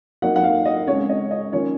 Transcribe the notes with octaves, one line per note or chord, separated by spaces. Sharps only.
F#3 A#3 D#4 F#5
F#5
F5
D#5
C#3 G#3 C4 C#5
D#5
D#5
D#3 A#3 C#4 F4 C#5